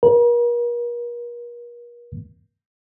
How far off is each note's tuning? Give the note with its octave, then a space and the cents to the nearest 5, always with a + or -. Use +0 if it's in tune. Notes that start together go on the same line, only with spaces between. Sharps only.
A#4 +40